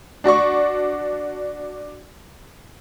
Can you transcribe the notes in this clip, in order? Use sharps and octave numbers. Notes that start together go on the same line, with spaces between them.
D4 F#4 D5 C#6